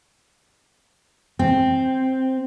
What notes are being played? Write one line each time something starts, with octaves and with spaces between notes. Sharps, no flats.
C4